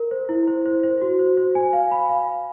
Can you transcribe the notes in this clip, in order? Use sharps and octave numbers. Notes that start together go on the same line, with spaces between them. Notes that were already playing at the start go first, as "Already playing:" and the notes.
Already playing: A#4
C5
E4
C5
C5
C5
F#4
C5
C5
G#5
F5
B5
F5
F5